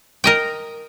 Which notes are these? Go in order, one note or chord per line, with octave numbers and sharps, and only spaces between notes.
A#4 D#5 G5